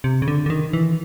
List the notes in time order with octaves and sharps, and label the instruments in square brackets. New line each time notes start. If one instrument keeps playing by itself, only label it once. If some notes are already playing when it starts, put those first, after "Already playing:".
[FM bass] C3
C#3
D3
D3
D#3
E3